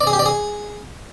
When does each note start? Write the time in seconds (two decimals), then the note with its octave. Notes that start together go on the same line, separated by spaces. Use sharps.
0.01 D5
0.07 G#4
0.13 G4
0.19 D5
0.26 G#4